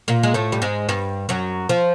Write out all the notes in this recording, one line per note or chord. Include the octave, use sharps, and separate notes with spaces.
A#2 A#3
G#3
A2 A3
G3
G#2 G#3
G2 G3
F#2 F#3
F3